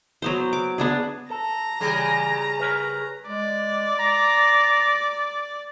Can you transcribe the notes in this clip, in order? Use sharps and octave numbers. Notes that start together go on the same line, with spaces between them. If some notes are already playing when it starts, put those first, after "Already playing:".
F#3 B3 C5
D6
B3 D4 G#4
A4 A#5
C#3 E3 G3 G#4
A#4 B4 C#5
G#3 D5
A#5